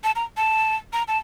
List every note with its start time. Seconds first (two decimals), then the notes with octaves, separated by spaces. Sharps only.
0.04 A5
0.16 A#5
0.37 A5
0.93 A#5
1.08 A5